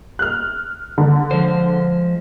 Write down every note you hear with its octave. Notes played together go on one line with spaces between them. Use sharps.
F6 F#6
D3
F3 G#3 C5